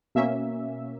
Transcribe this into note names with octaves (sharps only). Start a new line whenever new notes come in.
B2 A#3 C#4 E5